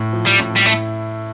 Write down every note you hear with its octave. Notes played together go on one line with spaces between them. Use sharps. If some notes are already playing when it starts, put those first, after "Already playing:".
Already playing: A2
F3
G3
A2
G3
A3 E4